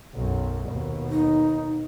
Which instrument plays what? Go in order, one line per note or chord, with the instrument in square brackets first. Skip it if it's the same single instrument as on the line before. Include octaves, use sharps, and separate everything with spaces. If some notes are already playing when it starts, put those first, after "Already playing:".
[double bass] B1 F#2
D#2 B2
[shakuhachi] D#4